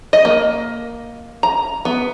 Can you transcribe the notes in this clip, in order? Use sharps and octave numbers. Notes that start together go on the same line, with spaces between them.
D#5
A#3
A#5
B3